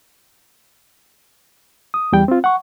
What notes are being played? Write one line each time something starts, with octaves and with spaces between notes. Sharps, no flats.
D#6
E2 G3 G5
C4 F4
F#5 C#6